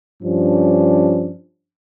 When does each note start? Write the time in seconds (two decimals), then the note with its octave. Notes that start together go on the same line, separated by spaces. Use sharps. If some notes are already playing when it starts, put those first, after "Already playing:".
0.23 G2 F3 C#4 D4